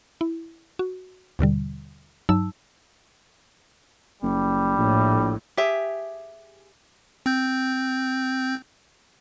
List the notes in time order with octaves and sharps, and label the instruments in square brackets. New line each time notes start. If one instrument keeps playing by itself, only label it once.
[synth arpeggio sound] E4
F#4
D#2 B2 D3 G3
G2 F#3 D#4 A5 E6
[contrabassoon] F#1 [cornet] G3
[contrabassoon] A#1 [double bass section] A2
[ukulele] G4 G#4 E5
[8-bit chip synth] C4 G6